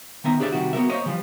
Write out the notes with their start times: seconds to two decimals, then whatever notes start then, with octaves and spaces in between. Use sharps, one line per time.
0.24 D#3 B3 E5 A#5
0.39 D4 G4 G#4 C5 D5 E5
0.52 C3 D#3 G3 F#4
0.73 B3 F#4 A#4 E5
0.89 A#3 C5 C#5 D#5
1.06 E3 F3 G3